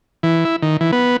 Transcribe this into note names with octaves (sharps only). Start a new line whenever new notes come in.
E3
E4
D#3
E3
B3